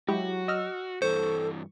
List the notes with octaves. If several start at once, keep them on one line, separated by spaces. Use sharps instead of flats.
F#3 G#3 E4 F#4 G4
D#5 E6 F6
G2 E3 A4 C5 C#6